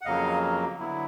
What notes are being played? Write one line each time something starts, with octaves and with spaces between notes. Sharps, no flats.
F#5
F2 C#3 F#3 A#3 D#5 F5
D3 F#3 B3 E4